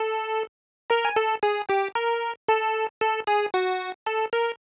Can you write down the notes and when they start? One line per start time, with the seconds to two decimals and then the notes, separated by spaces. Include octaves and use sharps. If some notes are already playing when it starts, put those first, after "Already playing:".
Already playing: A4 A5
0.90 A#4 A#5
1.05 G#5
1.16 A4 A5
1.43 G#4 G#5
1.69 G4 G5
1.95 A#4 A#5
2.48 A4 A5
3.01 A4 A5
3.27 G#4 G#5
3.54 F#4 F#5
4.06 A4 A5
4.33 A#4 A#5